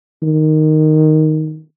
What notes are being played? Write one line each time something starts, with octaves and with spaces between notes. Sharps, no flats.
D#3